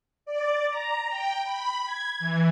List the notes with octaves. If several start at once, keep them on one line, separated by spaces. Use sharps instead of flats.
D5
A#5
G5
B5
G#6
E3